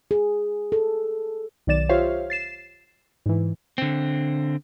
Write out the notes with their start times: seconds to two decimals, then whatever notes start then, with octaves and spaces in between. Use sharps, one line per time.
0.11 G#4
0.72 A4
1.67 B1 D#3 F#3 D5 A6 E7
1.89 F4 G4 C5 C#5 E5 F5
2.30 A6 C7 E7
3.26 G#2 E3
3.78 D3 C4